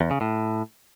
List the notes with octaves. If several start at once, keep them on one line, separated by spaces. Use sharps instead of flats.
E2
C#3
A2